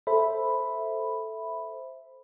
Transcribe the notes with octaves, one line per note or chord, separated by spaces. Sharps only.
A4 C5 E5 B5